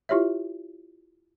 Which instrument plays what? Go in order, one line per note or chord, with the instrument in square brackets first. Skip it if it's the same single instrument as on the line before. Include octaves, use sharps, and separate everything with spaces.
[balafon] E4 F4 G4 C#5 E5